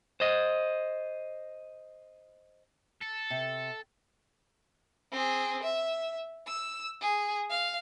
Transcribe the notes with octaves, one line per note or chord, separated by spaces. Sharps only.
C5 D#5
A4
C3
C4 G#4
E5
E6
G#4
F5